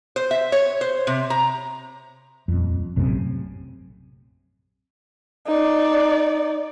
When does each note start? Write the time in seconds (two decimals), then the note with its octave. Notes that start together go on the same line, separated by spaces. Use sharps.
0.16 C5
0.31 E5
0.52 C#5
0.81 C5
1.07 C3
1.30 A#5
2.48 D#1 F2
2.96 A#1 F#2 A2 C3
5.47 D#4 D5